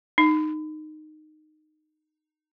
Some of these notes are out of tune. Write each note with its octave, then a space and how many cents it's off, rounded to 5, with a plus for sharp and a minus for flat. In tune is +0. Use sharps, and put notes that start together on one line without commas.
D#4 -15